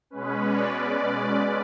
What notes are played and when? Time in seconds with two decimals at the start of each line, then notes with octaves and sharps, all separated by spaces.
0.10 B2 G#3 C#4 B4
0.47 D5
0.83 D5